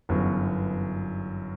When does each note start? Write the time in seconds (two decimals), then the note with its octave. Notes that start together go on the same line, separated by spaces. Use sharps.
0.09 G1 F#2 E3 B3 F#4